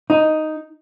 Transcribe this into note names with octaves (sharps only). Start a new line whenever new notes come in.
D#4